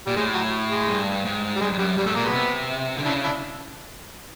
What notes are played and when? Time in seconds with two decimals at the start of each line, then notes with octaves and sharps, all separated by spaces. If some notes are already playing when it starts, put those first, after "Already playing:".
0.06 A#2 G3
0.16 A2 G#3
0.34 F#3
0.71 G#3
0.88 G2
1.25 G#2
1.56 G3
1.61 G2 G#3
1.73 G2
1.79 F#2 G3
1.97 G2 G3
2.06 G#2 A3
2.15 A#2 A#3
2.24 F#3 G#3 B3
2.33 C3
2.97 D3
3.06 C#3 D4 E4
3.24 D4 E4